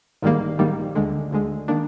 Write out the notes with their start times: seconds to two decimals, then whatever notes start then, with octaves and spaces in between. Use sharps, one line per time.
0.22 A#1 G#2 D#3 G3 A#3
0.58 A#1 G#2 D#3 G3 A#3
0.95 D2 D3 G#3
1.31 D2 D3 G#3
1.68 D#3 A#3 D4